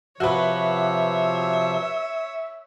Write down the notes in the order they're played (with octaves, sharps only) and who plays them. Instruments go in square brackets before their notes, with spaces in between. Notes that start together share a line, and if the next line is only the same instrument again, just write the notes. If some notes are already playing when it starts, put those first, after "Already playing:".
[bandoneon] C3 F3 [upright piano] F#4 B4 [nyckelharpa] C#5 [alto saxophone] E5